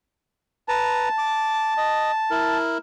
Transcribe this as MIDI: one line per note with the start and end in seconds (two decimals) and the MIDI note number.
0.68 1.09 71
0.68 2.57 81
0.68 1.09 82
1.18 1.74 86
1.77 2.11 75
2.31 2.78 64
2.31 2.78 70